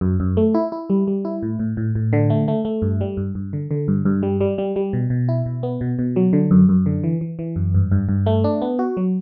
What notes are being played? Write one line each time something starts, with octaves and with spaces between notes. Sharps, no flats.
F#2
F#2
A3
E4
E4
G3
G3
E4
A2
A2
A2
A2
D3
A3
A3
A3
G2
G3
G2
G2
D3
D3
G2
G2
G3
G3
G3
G3
B2
B2
E4
B2
B3
B2
B2
F#3
D3
F#2
F#2
D3
E3
E3
E3
F#2
G2
G2
G2
A3
D4
B3
F#4
F#3